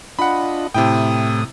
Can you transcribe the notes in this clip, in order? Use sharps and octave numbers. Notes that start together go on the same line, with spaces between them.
D4 F4 D#5 F#5 B5
A2 C3 E4 G5 D#6